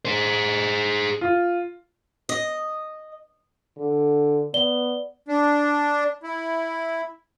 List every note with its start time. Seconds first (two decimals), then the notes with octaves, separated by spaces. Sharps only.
0.05 G#4 C5
1.21 F4
2.29 D#5
3.77 D3
4.54 B3 D5 G7
5.28 D4
6.23 E4